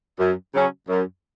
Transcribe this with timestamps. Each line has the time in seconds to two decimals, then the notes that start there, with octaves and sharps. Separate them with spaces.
0.19 F#2
0.54 C#3 F#3 C#4
0.89 F#2